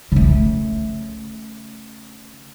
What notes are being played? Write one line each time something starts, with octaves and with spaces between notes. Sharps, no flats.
C#3 A3